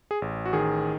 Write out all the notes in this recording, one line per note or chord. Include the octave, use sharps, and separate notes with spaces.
G#4
A1
F#4
D#3 G#4